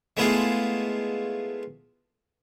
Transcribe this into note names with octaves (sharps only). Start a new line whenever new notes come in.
G#3 A3 B3 E4 F4 G#4